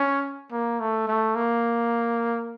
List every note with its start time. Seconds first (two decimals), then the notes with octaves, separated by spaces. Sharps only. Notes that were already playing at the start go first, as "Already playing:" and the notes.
Already playing: C#4
0.51 A#3
0.80 A3
1.08 A3
1.35 A#3